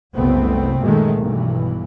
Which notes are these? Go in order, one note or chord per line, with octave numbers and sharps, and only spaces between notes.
F#1 C2 A3 B3 C4
F#2 A#2 D#3 G#3 A3
B1 G2 E3